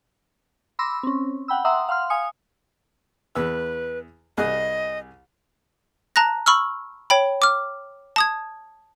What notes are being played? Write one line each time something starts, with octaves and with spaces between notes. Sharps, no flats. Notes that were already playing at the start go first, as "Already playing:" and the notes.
B5 C6 D6 E6 A#6
C4 C#4
F#5 G5 B5 E6
E5 F#5 A#5 C6 D#6 E6
F5 F#5 C6 F6
F5 G#5 D#6 C#7
E2 B4 E6
C2 G#4 D#5 F#6
A5 A#5 F#6 A#6
B5 C#6 E6 F6
C#5 G5 B5
D6 F6
A5 D#6 G#6